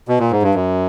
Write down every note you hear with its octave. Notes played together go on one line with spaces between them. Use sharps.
B2
A#2
G#2
G2
F#2